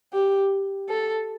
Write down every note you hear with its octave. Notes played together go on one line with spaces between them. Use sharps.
G4
A4